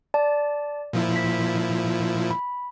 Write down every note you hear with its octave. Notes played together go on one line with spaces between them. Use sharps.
D5 A5
A#2 F3 E4
B6
B5